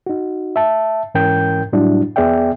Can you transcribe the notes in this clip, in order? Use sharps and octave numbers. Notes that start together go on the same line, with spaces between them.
D#4 F#4
E5 A5
G#2 E3 C#4 A#4 G5 G6
A2 F#3 G3 D4 E4 F#4
E2 B3 G#4 D5 E5 G5